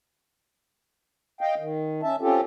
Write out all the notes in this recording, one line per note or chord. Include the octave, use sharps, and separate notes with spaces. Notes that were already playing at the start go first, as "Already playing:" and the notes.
D#5 F5 G5
D#3
C#4 E5 A5
C4 C#4 F4 G4 A4